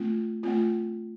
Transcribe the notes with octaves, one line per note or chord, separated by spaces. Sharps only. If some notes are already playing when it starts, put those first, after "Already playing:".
Already playing: A3 C4 F4
A3 C4 F4